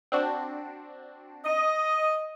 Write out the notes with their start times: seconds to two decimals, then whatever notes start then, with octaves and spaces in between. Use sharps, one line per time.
0.12 C4 D4 F#4
1.46 D#5